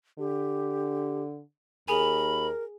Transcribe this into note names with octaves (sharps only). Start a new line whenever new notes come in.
D3 G4
D#2 G#4 A#4 G#5 B5